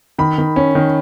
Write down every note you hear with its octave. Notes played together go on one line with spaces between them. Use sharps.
D#3 B5
D#3
C#4
D#3